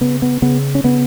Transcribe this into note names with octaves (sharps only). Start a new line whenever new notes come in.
C#3 B3
B3
C#3 B3
C#4
C#3 B3